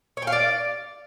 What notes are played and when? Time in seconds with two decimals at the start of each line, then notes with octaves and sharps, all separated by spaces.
0.17 C#5
0.22 G5
0.27 F5
0.32 D5